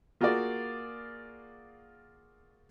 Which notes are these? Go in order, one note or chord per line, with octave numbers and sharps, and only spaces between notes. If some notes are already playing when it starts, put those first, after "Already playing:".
A#3 F4 F#4 G#4 A#4 D5